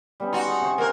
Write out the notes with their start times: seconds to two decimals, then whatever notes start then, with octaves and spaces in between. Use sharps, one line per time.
0.20 G3 B3 C#4
0.33 D#4 F#4 C6
0.46 G#4 A5
0.61 C3 C5 C#6
0.78 A#3 A#4 D#5 F#5 C#6